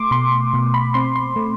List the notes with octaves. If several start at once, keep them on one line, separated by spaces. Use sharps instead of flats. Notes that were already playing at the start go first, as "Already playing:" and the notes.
Already playing: A3 C6 D6
B2 C6
B2
B5
C4 C6
C6
A3